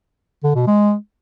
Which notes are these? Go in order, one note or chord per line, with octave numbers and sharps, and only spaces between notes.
D3
B2
G#3